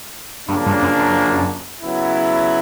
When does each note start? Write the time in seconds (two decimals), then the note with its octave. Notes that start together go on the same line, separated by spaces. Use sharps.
0.48 G2 C#3 F3 A#3 D4
0.66 G2
0.82 F#2
0.99 F#2
1.82 C#3 F#3 B3 E4